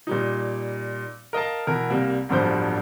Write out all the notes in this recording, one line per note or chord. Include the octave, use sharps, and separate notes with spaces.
A#2 G3 D#4
A#4 D#5 F5 A5
B2 E3 A#4
C2 G3 A#3
D1 G1 G2 F3 C5 G6